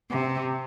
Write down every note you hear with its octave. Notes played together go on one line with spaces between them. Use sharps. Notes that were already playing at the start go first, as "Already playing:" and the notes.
C3